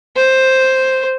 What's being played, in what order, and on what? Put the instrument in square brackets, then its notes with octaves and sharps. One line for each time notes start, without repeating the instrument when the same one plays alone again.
[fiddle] C5